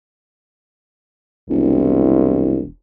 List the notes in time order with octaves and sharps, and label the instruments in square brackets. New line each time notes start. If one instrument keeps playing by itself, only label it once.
[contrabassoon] E1 [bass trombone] C2